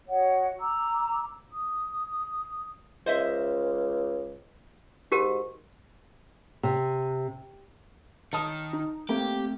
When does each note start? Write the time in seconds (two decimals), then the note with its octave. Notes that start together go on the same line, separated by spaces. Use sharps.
0.08 F#4 C#5 D#5 F#5
0.59 A#5 D6 E6
1.51 D#6
3.06 C#2 C5 D#5 E5
5.12 G#2 F#4 G4 A#4
6.63 C3
8.33 D#3 A5 D#6
8.73 D#4
9.09 A3 A#3 C4 G4 G5